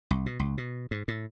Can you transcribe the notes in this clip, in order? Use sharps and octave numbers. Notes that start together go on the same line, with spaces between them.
C2
B2
C#2
B2
G#2
A2